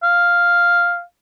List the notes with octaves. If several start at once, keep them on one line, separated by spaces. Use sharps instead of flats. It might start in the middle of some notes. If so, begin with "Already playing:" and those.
F5